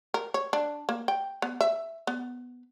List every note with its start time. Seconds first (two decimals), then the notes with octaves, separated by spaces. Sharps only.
0.14 A#4
0.34 C#5
0.53 D4
0.89 A#3
1.08 G5
1.42 B3
1.61 E5
2.07 B3